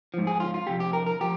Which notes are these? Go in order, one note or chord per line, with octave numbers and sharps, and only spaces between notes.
G#2 F3
G#4
F4
F4
F2 C3 G4
G4
A#4
A#4
F3 G4